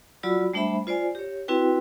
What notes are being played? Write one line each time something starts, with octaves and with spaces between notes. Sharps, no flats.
F#3 F4 F#4 D5 B5 E6
G3 A3 D4 C5 E5 B5
F4 C5 D5 G#5
G4 C#5
C4 E4 F#4 B4 G5